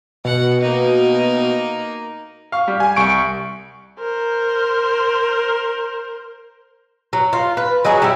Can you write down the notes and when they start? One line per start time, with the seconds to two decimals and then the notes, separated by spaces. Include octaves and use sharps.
0.25 B2 F#5
0.61 A#3 D#4
2.52 F5 C#6
2.68 G3
2.80 G#5
2.97 C2 C#6 D7
3.99 A#4 C5
7.13 F#3
7.33 F4
7.57 B4
7.85 F#3 D#4 F#4 G#4
8.02 G3 E4